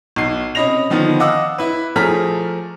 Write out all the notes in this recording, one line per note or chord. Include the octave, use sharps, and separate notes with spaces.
B1 C7
C3 C#4 D#5 B5 A#6 F7
D3 D#3 F3 B3
D#5 F5 F#5 D6 E6
E4 B4
F3 A3 G#4 A#5 F6 B6